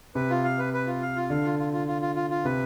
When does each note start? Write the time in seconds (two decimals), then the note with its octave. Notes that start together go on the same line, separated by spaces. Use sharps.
0.15 C3 B4
0.30 F4
0.44 F5
0.58 B4
0.73 B4
0.87 F4
1.02 F5
1.16 F4
1.30 D3 F5
1.44 F4
1.59 F4
1.73 F4
1.87 F4
2.02 F4
2.16 F4
2.30 F4
2.45 C3 B4